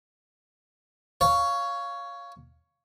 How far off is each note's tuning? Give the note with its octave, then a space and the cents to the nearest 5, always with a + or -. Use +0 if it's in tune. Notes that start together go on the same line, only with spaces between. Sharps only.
C#5 +10 F5 +0